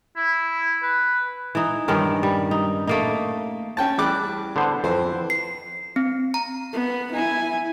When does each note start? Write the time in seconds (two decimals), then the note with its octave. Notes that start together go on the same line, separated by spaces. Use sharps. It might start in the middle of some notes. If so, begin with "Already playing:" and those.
0.17 E4
0.83 B4
1.55 E3 D#4
1.88 G2 D#3 C#4 A#4
2.23 G3
2.51 D#4
2.87 A3 A#3 D#4
3.77 C#4 G5 A5
3.98 E2 G3 D6 F#6
4.56 D3 B3 C5
4.84 F2 E3 C5
5.30 C7
5.96 C4
6.34 A#5
6.73 B3
7.13 E4 G#5